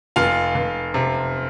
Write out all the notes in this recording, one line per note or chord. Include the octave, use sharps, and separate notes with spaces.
F1 F4 F5
F1
C3